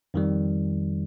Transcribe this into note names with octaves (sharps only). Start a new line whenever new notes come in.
F2 D#3 G3